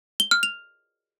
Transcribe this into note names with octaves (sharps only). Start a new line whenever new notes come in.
G7
F6
F7